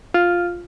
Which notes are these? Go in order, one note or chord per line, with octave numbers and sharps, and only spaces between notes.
F4